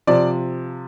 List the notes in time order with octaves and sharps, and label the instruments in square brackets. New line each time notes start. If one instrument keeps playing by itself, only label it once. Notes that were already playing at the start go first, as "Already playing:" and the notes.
[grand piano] C3 F3 D5